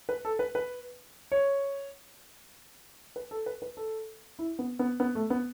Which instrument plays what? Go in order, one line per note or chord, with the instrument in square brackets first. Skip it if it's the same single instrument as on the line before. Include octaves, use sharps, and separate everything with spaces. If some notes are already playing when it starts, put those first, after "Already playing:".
[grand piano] B4
A4
B4
B4
C#5
B4
A4
B4
B4
A4
E4
B3
B3
B3
A3
B3